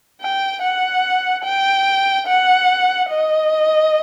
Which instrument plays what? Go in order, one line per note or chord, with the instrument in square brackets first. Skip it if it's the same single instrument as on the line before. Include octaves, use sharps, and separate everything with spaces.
[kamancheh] G5
F#5
G5
F#5
D#5